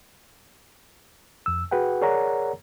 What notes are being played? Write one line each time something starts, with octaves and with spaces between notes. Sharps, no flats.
F2 E6
F#4 G#4 B4 F#5 G5
G#4 A#4 C#5 D5 F#5 A#5